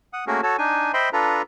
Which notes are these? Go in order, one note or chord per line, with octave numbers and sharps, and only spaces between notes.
F#5 D#6
A3 A#3 C#4 F#4 G#4 A#4
F#4 A4 C#5 A5
D4 D#4 G#5
C5 D#5 E5 G5 B5 C6
D4 F4 A4 B4 A#5